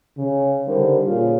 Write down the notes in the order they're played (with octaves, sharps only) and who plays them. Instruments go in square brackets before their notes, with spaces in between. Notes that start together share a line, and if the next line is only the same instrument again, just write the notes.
[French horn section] C#3
D3 G3 D#4 G4 A#4 C5
A#2 C#3 F4